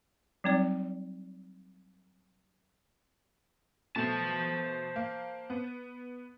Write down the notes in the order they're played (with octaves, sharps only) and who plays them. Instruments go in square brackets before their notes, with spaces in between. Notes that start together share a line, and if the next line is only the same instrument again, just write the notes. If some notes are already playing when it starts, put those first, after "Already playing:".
[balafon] F#3 G3 C4 D#4 D5
[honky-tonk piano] B2 A3 [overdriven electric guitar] C5 A5
[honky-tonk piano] A#3
B3